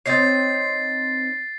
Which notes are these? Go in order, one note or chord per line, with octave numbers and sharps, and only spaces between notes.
C4 D#4 C#5 A6 C7